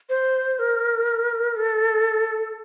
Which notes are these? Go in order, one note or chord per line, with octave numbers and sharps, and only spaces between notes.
C5
A#4
A4